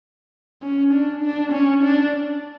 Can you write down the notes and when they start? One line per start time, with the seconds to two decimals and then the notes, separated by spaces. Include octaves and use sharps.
0.62 C#4
0.93 D4
1.23 D4
1.52 C#4
1.83 D4